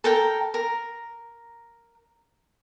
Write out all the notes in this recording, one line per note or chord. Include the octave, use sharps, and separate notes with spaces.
A4 A#4 G5
A#4